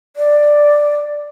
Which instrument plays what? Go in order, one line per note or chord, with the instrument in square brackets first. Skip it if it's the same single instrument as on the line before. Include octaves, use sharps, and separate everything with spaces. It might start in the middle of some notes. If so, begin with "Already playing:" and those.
[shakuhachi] D5